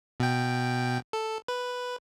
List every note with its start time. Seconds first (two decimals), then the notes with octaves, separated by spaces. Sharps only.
0.20 B2 G5
1.13 A4
1.48 B4